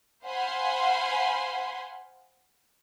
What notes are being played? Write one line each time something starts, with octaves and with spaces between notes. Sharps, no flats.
C5 F5 F#5 G#5 B5 C6